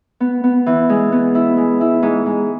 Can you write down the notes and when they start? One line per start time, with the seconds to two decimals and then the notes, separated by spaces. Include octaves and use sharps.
0.20 B3
0.44 B3
0.66 E3
0.89 G#3
1.12 B3
1.35 E4
1.57 G#3
1.81 E4
2.03 G#2
2.26 G#2